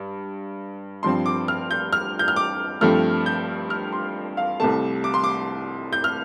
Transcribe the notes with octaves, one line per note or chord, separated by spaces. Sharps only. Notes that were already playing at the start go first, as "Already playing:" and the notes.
Already playing: G2
G2 F3 C4 C6
D6
F6
G6
F6
G6
F6
D6
G2 F3 A3 C4 F6
G6
F6
C6
F5
C2 C3 A3 A5
D6
C6
D6
G6
F6